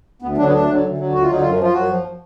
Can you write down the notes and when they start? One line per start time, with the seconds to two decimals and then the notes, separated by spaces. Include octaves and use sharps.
0.22 D2 B3
0.38 D3 F#3 D4
0.46 B3
0.53 D2 D4
0.67 D3 F#3
0.83 D2
0.98 D3 F#3
1.13 D2 F#4
1.22 F4
1.28 D3 F#3 D#4
1.41 F#2 F4
1.58 F3
1.64 F4
1.73 F#2 F#4
1.88 F3